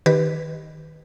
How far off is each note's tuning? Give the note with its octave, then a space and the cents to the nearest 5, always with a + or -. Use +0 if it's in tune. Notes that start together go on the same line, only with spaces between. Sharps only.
D#3 +0 G4 +0 B4 +0